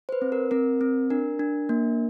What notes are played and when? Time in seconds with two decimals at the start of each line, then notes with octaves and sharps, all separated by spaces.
0.09 C5
0.12 B4
0.22 C4
0.32 A#4
0.51 C4 A#4
0.81 C4
1.10 D4 A#4
1.39 D4
1.69 A#3